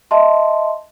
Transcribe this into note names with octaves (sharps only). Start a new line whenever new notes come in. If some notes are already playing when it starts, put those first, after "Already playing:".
D#5 E5 A5 C6